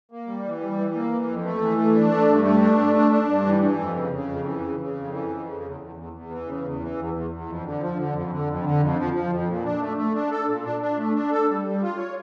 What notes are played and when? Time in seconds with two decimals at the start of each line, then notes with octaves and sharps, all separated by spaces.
0.12 A#3
0.27 G3
0.45 E3
0.61 G3
0.78 E3
0.95 A#3
1.12 E3
1.28 F2
1.45 A3
1.61 E3
1.78 A3
1.95 D4
2.11 A3
2.28 G2
2.45 A3
2.61 D4
2.78 A3
2.96 D4
3.12 D4
3.28 G2
3.46 E3
3.62 E3
3.79 F2
3.96 C#3
4.12 C#3
4.29 F2
4.46 E3
4.62 C#3
4.80 C#3
4.95 F2
5.12 E3
5.29 F2
5.47 C#3
5.63 E2
5.80 E2
5.96 E2
6.13 E2
6.30 E3
6.46 C#3
6.63 E2
6.80 E3
6.97 E2
7.13 E2
7.31 E2
7.46 F2
7.64 D3
7.80 F3
7.96 D3
8.13 F2
8.31 D3
8.47 F2
8.64 D3
8.80 F2
8.98 F3
9.13 F3
9.31 F2
9.48 A#2
9.65 D4
9.80 A3
9.97 A3
10.14 D4
10.31 A4
10.48 A#2
10.64 D4
10.82 D4
10.97 A3
11.15 D4
11.31 A4
11.49 G3
11.65 G3
11.82 F4
11.98 C#5